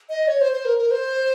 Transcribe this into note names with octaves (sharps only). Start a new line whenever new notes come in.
D#5
C#5
C5
C5
A#4
A#4
C5